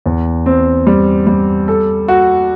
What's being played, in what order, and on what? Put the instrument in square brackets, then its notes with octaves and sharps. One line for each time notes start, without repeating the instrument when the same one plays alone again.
[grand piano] E2
C4
G3
G3
A4
F#4